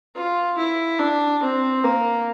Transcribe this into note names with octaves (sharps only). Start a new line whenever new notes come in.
F4
E4
D4
C4
A#3